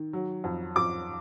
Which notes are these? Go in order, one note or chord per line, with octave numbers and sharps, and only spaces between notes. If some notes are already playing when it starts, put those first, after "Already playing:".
Already playing: D#3
F#3
F2
F2 D6